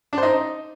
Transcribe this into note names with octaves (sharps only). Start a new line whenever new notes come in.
D4
C5
D#4